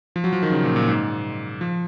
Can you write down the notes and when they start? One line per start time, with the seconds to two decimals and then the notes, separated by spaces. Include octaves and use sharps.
0.16 F3
0.24 F#3
0.33 F3
0.43 D#3
0.51 C#3
0.64 A#2
0.76 A#2
0.88 G#2
1.61 F3